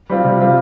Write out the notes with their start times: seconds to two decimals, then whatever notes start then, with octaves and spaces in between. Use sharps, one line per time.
0.10 G3 C4 F4
0.24 C3
0.40 G3 C4 F4